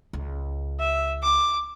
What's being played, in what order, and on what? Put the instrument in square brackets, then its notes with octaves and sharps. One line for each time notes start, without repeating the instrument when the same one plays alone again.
[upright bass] C#2
[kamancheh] E5
D6